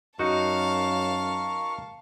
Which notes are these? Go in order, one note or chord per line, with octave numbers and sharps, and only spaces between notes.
F#2 D#4 F#4 A#4 F5 A5 C#6